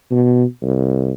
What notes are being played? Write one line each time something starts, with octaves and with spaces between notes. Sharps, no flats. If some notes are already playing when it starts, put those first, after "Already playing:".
B2
C2